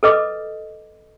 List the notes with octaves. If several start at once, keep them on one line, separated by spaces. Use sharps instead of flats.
A4 B4 D#5 D6